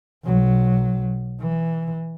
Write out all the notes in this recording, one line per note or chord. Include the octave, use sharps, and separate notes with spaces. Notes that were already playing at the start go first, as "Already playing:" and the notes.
B1 F#3
E3